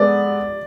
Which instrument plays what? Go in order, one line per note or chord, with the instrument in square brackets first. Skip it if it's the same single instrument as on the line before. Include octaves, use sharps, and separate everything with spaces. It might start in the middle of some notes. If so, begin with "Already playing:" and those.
Already playing: [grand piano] G#3 B3 A4 [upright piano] D5